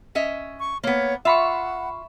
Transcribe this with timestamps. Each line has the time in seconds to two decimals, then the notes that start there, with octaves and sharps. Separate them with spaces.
0.15 C#4 D#5 E5
0.60 C#6
0.84 A#3 B3 C#5
1.25 F4 E5 F#5 B5 C#6